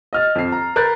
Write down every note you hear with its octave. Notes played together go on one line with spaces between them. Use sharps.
D#5 F6 A6
F2 C7
A#5
A#4 B4 F#6 G6 A6